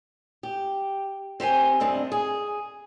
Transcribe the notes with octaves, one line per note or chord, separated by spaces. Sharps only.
G4
C4 G4 C5 G#5
G2 C3 C4 D4 D#5
G#4